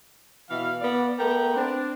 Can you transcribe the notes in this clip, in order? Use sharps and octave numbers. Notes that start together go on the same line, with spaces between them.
B2 E3 F5
B3 D5
A3 B3 A#4 G5
C4 D4